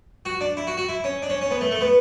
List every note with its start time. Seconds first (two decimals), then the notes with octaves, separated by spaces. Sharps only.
0.25 F#4
0.41 D4
0.57 E4
0.67 F#4
0.77 F#4
0.89 E4
1.04 C#4
1.22 D4
1.30 C#4
1.41 C#4
1.51 B3
1.61 A3
1.71 A3
1.81 B3